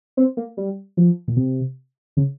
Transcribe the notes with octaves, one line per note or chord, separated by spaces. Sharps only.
C4
A#3
G3
F3
A#2
C3
C#3